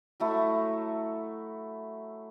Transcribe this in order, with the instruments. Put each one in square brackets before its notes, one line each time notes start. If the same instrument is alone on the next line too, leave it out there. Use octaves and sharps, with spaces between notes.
[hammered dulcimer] F#3 A3 E4